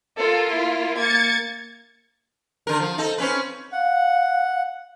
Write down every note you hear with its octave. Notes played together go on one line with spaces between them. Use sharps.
A#3 F4 A4
E4
A#3 G#6 A6 C#7
D3 A#4
F3
D#4 A4
C4 C#4 B4
F5 F#5